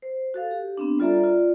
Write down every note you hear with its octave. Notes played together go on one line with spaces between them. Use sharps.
C5
F#4 A4 F5
G4
B3 C4 D4
G3 F4 A4 D5 E5 A#5
F4 D5